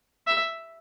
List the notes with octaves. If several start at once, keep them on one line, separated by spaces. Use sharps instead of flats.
E5